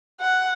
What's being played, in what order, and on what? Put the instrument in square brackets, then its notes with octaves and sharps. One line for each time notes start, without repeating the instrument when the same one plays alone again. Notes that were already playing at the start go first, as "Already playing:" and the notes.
[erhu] F#5